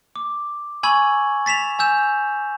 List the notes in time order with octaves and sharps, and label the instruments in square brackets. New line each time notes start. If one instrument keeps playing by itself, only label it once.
[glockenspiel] D6
G#5 B5 C#6 E6 G#6 F#7
A6 B6 E7 F7
G#5 E6 G6 E7